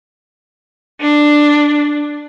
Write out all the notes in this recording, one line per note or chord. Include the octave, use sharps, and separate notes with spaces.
D4